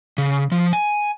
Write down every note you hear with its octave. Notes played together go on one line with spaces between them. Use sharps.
C#3
F3
G#5